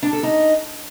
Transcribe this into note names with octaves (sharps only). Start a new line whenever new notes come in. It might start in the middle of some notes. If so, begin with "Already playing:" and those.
D4
A4
D#4